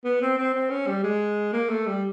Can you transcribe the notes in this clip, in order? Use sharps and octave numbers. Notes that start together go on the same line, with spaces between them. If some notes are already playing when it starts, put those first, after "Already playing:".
B3
C4
C4
C4
C#4
G3
G#3
A#3
A3
G3